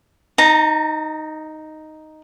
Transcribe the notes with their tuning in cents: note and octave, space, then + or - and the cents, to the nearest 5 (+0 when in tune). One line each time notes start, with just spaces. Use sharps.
D#4 +0 A#5 -40